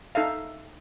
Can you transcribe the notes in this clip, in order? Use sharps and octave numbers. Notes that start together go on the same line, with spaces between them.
D#4 A4 E5 F5